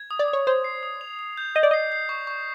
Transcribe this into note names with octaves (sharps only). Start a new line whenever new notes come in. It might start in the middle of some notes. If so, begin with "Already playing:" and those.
Already playing: G#6
D#6
D5
D#6
C#5
C5 G#6
C7
D#6
F7
F7
G6
D#5 G6
D5
D#5 C7
C7
C#6
C#6